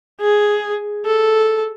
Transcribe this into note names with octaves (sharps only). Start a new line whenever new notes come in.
G#4
A4